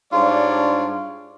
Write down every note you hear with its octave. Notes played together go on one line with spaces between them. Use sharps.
G#2 G3 D4 F4 C#5 D5